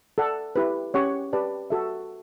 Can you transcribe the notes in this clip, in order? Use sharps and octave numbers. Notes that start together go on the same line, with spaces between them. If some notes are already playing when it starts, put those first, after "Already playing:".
A4 D5 F#5
E4 G4 B4
C#4 G4 C#5 F#5 C#6
G4 B4 D5 A5
F#4 A4 E5